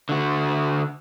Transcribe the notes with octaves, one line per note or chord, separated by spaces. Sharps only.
D3 F#4